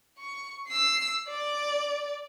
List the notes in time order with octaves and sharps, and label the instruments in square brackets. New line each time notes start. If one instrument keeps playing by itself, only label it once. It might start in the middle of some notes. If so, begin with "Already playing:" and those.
[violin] C#6
E6 C7
D5